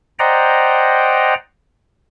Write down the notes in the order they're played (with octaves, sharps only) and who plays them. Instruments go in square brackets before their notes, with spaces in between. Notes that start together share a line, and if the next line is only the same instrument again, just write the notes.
[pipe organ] C5 D5 D#5 F#5 G5 A#5